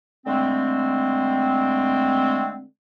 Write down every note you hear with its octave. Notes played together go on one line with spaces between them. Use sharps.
D3 G#3 A3 C4